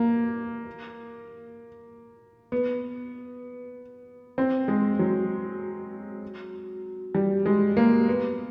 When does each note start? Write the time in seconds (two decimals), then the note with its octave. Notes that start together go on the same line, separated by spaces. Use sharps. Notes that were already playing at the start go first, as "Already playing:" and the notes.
Already playing: A#3
2.52 B3
4.38 C4
4.68 G#3
4.99 F#3
7.15 G3
7.46 G#3
7.77 A#3
8.08 B3